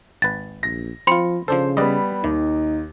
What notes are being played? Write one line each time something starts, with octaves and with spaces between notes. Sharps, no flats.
G#1 B4 A6
A#1 A#6
F3 C4 F4 B5 C6 C#7
C#3 F3 D4 A4 C5
G3 B3 B4 D5 D#5
D#2 D#3 D#4